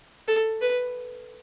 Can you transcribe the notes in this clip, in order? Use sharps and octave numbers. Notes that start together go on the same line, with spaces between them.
A4
B4